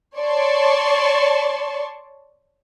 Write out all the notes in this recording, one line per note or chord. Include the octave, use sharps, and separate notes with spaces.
C#5 D5 A5 C6 C#6